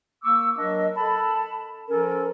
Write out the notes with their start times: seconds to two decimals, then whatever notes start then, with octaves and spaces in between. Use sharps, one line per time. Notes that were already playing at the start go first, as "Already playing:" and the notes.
0.24 A#3 C#6 D6 E6
0.58 F#3 D4 A#4 D#5
0.96 A4 A5 B5
1.89 F3 C#4 A4 A#4